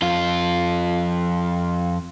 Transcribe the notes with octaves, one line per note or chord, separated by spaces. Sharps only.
F2 F4